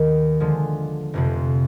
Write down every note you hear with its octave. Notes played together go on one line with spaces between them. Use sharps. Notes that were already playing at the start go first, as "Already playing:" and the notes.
Already playing: D#2 D#3 B3
D3 F3 G#3
F1 F2 C3